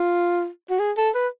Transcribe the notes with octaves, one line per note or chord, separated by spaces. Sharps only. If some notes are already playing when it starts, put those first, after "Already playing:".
Already playing: F4
F#4
G#4
A4
B4